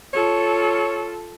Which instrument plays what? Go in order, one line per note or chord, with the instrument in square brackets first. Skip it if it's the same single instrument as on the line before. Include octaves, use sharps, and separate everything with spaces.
[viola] F4 A4 [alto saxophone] C#5